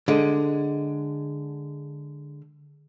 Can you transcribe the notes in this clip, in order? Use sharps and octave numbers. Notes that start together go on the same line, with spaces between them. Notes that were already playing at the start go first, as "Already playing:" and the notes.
D3 G#3